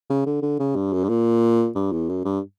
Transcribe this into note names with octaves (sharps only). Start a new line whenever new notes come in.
C#3
D3
D3
C#3
G2
F#2
G2
A#2
G2
E2
F#2
G2